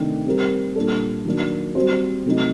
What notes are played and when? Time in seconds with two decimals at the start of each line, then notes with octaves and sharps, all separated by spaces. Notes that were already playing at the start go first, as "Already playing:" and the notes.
Already playing: C3 D#3 A3 D4
0.26 G3 C4 G4 A#4
0.76 A#2 G3 D4 A4
1.25 D#3 F#3 A#3 D4
1.75 G3 C4 F#4 C5
2.26 C3 F#3 A3 D#4